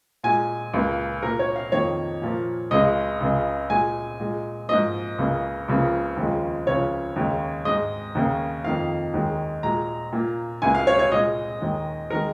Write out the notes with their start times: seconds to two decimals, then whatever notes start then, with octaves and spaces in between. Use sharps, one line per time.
0.24 A#2 G#3 G#5
0.74 C#2 C#3 A#3
1.23 A#2 A#3 A#4
1.39 C#5
1.56 F5
1.72 F2 D#3 A#3 C#5
2.22 A#2 F3 A#3
2.71 C#2 C#3 G#3 D#5
3.21 C#2 C#3 G#3
3.69 A#2 G#3 G#5
4.20 A#2 G#3
4.69 G#2 F3 A#3 D#5
5.18 C#2 C#3 A#3
5.68 C#2 C#3 F3 A#3
6.17 D#2 C#3 F3 G#3
6.67 C#2 C#3 F3 C#5
7.16 D#2 C#3 G#3
7.65 G#2 G#3 D#5
8.15 D#2 C#3 A#3
8.64 F2 D#3 A#3 F5
9.14 D#2 D#3 G#3
9.63 A#2 G#3 A#5
10.13 A#2 A#3
10.62 C#2 C#3 A#3 G#5
10.75 F5
10.87 C#5
10.99 C#5
11.12 A#2 G#3 D#5
11.61 D#2 D#3 G#3
12.10 D#3 G#3 A#4